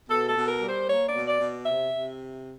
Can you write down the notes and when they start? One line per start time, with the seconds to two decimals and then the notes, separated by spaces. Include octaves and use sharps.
0.10 B2 A4
0.29 A4
0.35 B2
0.48 A#4
0.61 G3
0.68 C5
0.88 A#3 C#5
1.08 D5
1.14 B2
1.27 D5
1.39 B2
1.65 C3 E5
1.93 C3